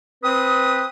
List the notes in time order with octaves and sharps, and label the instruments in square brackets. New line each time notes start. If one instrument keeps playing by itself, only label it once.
[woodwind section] C4 B4 D#6